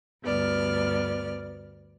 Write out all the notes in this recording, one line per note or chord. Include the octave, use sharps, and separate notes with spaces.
D2 G2 B3 D5 F6